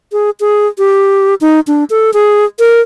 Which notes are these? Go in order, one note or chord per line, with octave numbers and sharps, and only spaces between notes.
G#4
G#4
G4
D#4
D4
A4
G#4
A#4